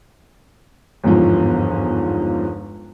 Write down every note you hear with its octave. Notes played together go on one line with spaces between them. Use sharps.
G1 E2 G#2 F3